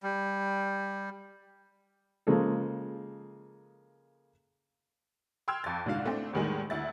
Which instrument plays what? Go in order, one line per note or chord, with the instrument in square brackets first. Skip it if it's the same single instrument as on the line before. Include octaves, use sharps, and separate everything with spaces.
[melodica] G3
[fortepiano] C#3 F3 G#3 A#3 G#4 A4
[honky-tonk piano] G5 C6 E6 F6 G#6
F2 A6
C2 G#2 D3 F#4 F5
A3 C4 D4
E2 A2 D#3 G3 G#3 G#5
D2 E4 A6